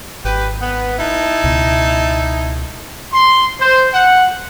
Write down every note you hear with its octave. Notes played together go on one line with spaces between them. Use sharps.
G#1 G4 B4
B3
D#4 E4 A5
C#2 B2
C6
C5
F#5